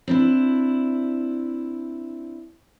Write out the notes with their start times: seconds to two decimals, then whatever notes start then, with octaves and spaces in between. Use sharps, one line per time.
0.08 C4 D4 E4